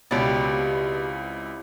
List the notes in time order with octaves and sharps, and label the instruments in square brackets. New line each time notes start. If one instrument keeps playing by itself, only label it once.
[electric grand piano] C#2 C#5 A6 [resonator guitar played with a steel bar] B2 G4 [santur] G3 C4 E4